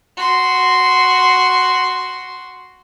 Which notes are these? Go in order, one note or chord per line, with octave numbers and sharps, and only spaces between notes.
F#4 C6